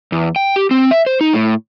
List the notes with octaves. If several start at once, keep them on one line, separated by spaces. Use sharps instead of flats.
E2
G5
G4
C4
E5
C5
D#4
A2